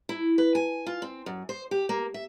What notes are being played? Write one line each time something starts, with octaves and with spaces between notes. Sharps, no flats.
E4
B4
G#5
F4
C4
F#2
C5
G4
A#3
E5